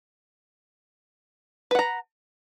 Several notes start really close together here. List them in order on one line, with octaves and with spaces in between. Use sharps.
B4 F#5 A#5